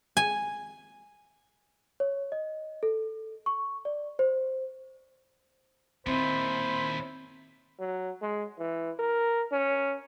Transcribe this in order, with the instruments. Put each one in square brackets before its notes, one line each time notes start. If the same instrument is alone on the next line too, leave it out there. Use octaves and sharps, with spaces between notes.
[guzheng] G#5
[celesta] C#5
D#5
A4
C#6
D5
C5
[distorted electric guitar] D#2 A#2 [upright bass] C4 [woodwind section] E4 B5 [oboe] C5
[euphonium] F#3
G#3
E3
A#4
C#4